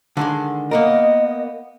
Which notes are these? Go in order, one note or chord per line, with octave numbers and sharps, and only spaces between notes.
D3 D#3 G#3
A#3 B3 A#4 D#5